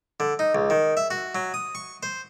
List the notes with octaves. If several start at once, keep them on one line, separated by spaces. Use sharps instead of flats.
D3
D#4
C#2
D#3
E5
F#4
F#3
D#6
C#6
C5